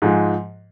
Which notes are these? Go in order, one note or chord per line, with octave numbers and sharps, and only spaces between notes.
G#2 F3 G#3